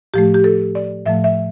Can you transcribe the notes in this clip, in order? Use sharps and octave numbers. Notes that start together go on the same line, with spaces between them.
A2 F3 A3 G4
G4
A4
D5
A2 F3 A3 E5
E5